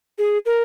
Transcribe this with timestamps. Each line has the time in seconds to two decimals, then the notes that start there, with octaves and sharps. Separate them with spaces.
0.18 G#4
0.46 A#4